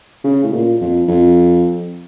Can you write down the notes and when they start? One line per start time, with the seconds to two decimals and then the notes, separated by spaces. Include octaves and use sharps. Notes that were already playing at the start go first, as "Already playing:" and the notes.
0.24 C#3
0.43 A2
0.52 A#2
0.81 F2
1.08 F2